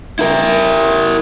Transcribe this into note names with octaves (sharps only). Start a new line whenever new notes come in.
E4 A#4